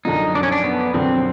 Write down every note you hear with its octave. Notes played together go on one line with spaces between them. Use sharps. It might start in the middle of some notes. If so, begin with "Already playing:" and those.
F#2 D3 F3 D#4
D4
C#4
D4
B3
F#2 D3 F3 C4